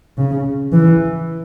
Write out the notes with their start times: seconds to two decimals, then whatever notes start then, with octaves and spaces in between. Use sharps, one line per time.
0.18 C#3
0.72 E3